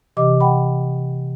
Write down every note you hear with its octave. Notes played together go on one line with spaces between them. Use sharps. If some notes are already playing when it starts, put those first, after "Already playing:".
C3 E3 G4 D#5 D6
F#5 G5 B5